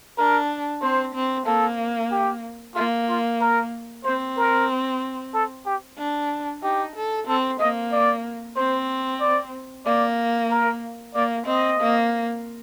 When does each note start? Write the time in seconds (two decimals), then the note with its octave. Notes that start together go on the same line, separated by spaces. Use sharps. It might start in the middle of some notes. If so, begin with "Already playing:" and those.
0.18 D4 A#4
0.82 C4 C5
1.15 C4
1.46 A#3 A4
2.11 G4
2.75 A#3 F4
3.09 F4
3.41 A#4
4.05 C4 C5
4.37 A#4
5.34 A4
5.66 G4
5.98 D4
6.62 D#4 G4
6.96 A4
7.27 C4 A4
7.59 A#3 D#5
7.92 D5
8.56 C4 C5
9.21 D5
9.86 A#3 D5
10.51 A#4
11.15 A#3 D5
11.47 C4 D#5
11.80 A#3